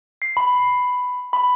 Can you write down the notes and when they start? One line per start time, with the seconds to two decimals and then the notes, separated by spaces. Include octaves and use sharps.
0.22 C7
0.37 B5
1.33 B5